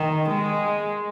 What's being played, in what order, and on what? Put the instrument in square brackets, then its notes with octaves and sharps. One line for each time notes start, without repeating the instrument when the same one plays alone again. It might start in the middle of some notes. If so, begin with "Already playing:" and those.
Already playing: [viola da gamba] D#3
G#3